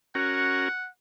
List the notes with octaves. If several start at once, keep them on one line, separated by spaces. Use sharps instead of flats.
C#4 F#4 A#4 F#5